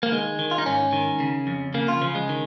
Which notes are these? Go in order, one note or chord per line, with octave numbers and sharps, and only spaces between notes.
A#3
D#3 G#3
D#3
F4
D#4
G#2 C#4
D#3
C#3
F2
C#3 A#3
F4
C#3 F3
G#3
D#3